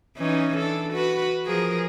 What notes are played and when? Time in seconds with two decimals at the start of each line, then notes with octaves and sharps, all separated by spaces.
0.17 E3 C#4 D#4
0.56 D4 A4
0.93 F#4 B4
1.46 F3 G#4 A#4